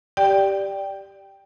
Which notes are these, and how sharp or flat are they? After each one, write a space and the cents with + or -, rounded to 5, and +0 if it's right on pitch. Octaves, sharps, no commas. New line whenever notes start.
G4 +0 D5 +0 G5 +0